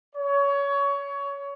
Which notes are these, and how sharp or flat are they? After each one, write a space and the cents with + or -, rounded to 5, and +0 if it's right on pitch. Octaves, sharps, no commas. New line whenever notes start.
C#5 +20